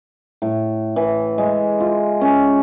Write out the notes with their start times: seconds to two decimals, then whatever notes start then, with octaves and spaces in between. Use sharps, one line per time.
0.42 A2
0.96 E3
1.38 G#3
1.80 F4
2.21 C#4